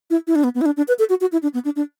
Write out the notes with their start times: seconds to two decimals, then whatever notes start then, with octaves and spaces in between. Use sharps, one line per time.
0.10 E4
0.27 E4
0.35 D4
0.44 B3
0.55 B3
0.61 E4
0.66 D4
0.77 D4
0.88 B4
0.99 A4
1.09 F#4
1.21 F#4
1.32 E4
1.43 D4
1.54 B3
1.65 D4
1.76 D4